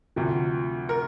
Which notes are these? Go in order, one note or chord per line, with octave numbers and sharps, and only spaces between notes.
D2 C3 F3
A#4